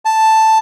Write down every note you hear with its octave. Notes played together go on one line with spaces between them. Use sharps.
A5